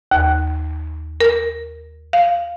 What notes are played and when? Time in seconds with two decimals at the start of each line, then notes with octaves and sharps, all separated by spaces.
0.11 D#2
1.20 A#4
2.13 F5